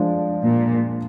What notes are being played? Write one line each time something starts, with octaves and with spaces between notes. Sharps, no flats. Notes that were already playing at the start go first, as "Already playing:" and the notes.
Already playing: F3 G#3 D4 F4
A#2